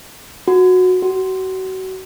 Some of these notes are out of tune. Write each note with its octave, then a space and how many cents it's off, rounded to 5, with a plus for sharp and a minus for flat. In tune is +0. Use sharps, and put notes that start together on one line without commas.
F#4 -15
F#4 +30